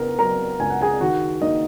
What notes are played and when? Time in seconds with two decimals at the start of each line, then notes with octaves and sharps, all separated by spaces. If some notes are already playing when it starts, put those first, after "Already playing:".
Already playing: C#3 B3 A#4 A#5
0.19 F#3 A#4 A#5
0.60 C#2 G#5
0.70 F#5
0.81 G#4 G#5
1.01 D#3 F#4 F#5
1.41 A#3 D#4 D#5